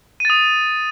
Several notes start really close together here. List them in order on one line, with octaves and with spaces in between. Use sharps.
D#7 A6 D#6